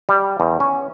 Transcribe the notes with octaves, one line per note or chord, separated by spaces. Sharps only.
G3
E2
C#4